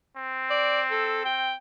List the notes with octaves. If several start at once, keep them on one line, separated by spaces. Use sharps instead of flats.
C4
D5
A4
G5